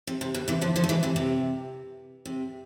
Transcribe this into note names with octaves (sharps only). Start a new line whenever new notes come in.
C3
C3
B2 D3
C3 E3
D3 F3
D3 F3
A3
E3 G#3
C3 E3
C3
C3